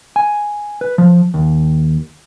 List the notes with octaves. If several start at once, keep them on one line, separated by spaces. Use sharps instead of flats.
G#5
B4
F3
D#2